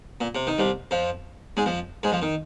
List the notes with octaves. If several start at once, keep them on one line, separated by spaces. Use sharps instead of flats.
A#2
C3
D#3
C2 C3
F2 F3
G#2 G#3
F2 F3
G#2 G#3
F2 F3
D#3